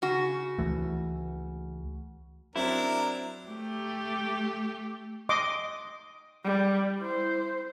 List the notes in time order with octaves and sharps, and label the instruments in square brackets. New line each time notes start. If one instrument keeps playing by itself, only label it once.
[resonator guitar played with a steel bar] C#3 F#4
[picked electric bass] C#2 E3 A3
[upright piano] F#3 C4 [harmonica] D4 A#4 [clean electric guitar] E4
[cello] A3 G4
[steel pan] D#5 C6 D6
[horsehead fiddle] G3
E4 C5